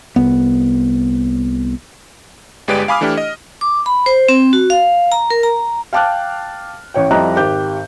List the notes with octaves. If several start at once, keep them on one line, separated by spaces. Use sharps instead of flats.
C2 B3
G1 G#3 G4 B4 D5 D7
F5 G#5 B5 D6 D#6 F6
E3 A3 D4 E4 G4
D#5
D6
B5
C5
C4
F#4
F5
A#5
A#4
A#5
F5 G5 A5 D6 F6 F#6
A1 C#5 G5
F2 G3 E4 D#5 A#5 F#6
G#1 G4 G6